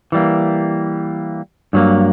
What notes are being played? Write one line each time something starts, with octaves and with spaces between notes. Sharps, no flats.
E3 G3 A#3
G2 F#3 A#3